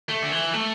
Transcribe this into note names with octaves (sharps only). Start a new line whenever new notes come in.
A3
D3
E3
A3